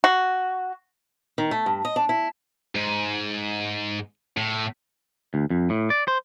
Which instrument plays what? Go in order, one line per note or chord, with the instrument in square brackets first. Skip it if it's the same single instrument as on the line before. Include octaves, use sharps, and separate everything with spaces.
[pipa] F#4
[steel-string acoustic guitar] D#3
A3
G2
D#5
D4
E4
[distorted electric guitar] G#2
A2
[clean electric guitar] D2
F2
A2
D5
C5